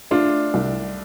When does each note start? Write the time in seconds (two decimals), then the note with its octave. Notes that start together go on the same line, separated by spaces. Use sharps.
0.11 A3 D4 F4
0.54 C2